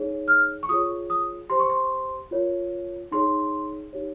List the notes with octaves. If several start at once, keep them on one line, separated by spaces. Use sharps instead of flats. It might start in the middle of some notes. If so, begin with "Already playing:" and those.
Already playing: D#4 G#4 C#5
F6
C#6
F4 G#4 C#5 D#6
D#6
G4 C5 C6
C#6
C6
F4 A#4 C#5
D#4 G#4 C#5 C6
D#4 G4 C#5